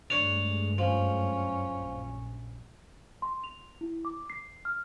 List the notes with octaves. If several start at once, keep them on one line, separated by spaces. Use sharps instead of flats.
G2 G#3 A3 D4 C#5 F7
F#2 F3 C#4
A#1
C6
F7
E4
D6
C7
F6